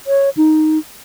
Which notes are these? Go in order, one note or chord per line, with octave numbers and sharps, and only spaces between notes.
C#5
D#4